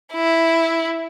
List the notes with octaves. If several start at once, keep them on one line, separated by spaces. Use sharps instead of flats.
E4